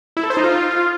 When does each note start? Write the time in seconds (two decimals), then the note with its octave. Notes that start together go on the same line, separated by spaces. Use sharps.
0.17 E4
0.23 A4
0.30 C5
0.37 D#4
0.44 F4